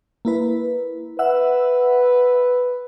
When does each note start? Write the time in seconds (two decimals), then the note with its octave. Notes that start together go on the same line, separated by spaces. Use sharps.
0.25 A#3 E4 B4
1.19 B4 E5 F#5 E6